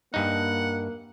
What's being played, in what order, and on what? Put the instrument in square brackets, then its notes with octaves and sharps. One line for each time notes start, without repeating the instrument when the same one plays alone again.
[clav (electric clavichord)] G2 D#4 [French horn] A#3 [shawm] F#5